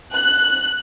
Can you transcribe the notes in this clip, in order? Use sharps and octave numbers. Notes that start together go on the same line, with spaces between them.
F#6